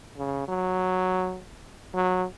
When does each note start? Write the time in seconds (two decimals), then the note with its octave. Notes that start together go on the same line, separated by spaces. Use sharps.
0.18 C#3
0.48 F#3
1.94 F#3